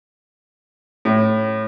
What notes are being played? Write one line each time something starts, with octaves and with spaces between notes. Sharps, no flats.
A2